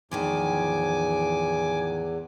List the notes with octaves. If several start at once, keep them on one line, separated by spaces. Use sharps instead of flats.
E2 A2 D#3 F3 G#5 D6